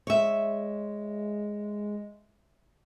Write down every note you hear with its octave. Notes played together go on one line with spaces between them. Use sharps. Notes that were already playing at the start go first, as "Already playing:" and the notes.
G#3 C#5 E5